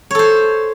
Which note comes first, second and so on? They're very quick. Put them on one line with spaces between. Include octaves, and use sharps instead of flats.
C#5 A4 C5